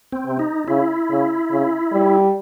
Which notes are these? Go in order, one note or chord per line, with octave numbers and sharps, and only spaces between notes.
C4
C3
D#4
C#3 E4
C#3
C#3
G3